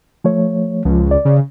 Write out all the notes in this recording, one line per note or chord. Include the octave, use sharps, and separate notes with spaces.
F3 A3 C#5
C#2 F3
D5
C#3